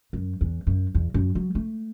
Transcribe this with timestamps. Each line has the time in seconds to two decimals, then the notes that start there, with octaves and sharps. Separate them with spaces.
0.13 F#2
0.41 E2
0.67 F#2
0.95 E2
1.14 F#2
1.35 F#3
1.55 A3